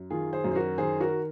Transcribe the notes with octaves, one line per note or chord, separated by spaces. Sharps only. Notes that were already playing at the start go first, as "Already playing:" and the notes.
Already playing: F#2
D#3 F4 G#4
G#4 C5
F#2
C5
F#4 A#4
D#3 G#4 C5
F#4 A#4